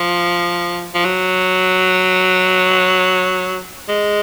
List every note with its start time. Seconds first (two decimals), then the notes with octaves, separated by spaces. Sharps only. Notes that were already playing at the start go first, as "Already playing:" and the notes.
Already playing: F3
0.94 F3
1.05 F#3
3.88 G#3